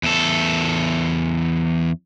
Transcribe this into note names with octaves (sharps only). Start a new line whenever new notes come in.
E2 A4